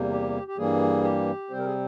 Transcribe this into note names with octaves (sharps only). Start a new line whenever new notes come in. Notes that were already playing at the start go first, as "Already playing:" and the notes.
Already playing: E2 C3 G3 A#3
G4
G4
G2 E3 G3 A#3 G#4
G4
C3 G3 C4 C5
A#4
G#4